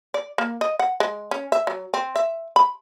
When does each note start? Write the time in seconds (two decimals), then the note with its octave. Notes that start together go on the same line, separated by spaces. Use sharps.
0.14 D5
0.38 A#3
0.61 D#5
0.79 F#5
1.00 G#3
1.31 C#4
1.52 E5
1.67 F#3
1.94 C4
2.16 E5
2.56 B5